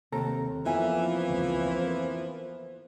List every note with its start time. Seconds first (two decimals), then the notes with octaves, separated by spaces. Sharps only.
0.12 D#2 C3 A4 A#5
0.66 F2 E3 F3 A#3 B3 E5 G#5
1.30 C#2
1.68 C5